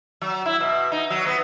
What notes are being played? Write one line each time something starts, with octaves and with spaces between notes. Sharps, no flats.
F#3
E4
B2
D#4
F#3
B3